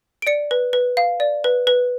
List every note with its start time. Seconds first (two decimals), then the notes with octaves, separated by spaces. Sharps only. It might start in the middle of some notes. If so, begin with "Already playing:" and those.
0.22 D7
0.27 D5 C#7
0.51 B4
0.73 B4
0.97 F5
1.20 D5
1.44 B4
1.67 B4